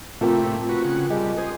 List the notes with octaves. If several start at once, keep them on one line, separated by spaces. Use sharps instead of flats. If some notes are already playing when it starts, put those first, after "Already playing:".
A2 C3 F3 A3 A#3 C4
F#4 B4
C#3 F#5
G3 G#3 A#5
G#4 C5